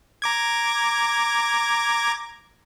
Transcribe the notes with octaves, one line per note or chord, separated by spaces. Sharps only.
A#5 D6 G#6